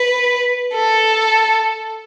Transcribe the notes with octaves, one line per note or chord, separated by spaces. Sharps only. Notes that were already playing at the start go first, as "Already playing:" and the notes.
Already playing: B4
A4